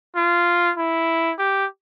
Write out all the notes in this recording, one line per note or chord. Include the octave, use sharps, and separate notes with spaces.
F4
E4
G4